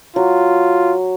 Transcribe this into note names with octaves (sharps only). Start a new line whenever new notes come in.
F#3 F4